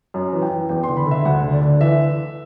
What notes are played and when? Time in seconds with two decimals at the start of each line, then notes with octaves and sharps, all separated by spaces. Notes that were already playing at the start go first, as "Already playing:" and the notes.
0.14 F#2
0.33 E3
0.42 G5
0.51 E3
0.69 E2 G5
0.83 C6
0.89 D3
0.97 B5
1.06 D3 E5
1.25 D2 F#5
1.43 D3
1.53 D5
1.61 D3
1.80 E3 E5